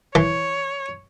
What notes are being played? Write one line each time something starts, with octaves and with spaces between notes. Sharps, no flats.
E3 C#5